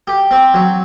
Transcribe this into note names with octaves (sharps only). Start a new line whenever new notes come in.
G4
C4
F#3